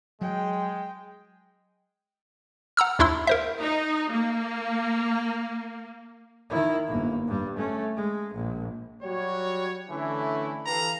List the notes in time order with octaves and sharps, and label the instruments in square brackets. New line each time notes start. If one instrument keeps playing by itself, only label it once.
[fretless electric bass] F#3 [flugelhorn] G#3 [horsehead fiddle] G5
[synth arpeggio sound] F#5 A#5 E6 F6
D#2 D4 E4 E5 C6 E6
A#4 C5 E5
[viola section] D#4
A#3
[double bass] D#3 E4
G1 A#3
G2 G3
A3 C#4
G#3
A#1
[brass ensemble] F#3 G3 F#4 C#5
D3 E3 A3 C#4 E4
E3 G4 A4 B4 F5 A#5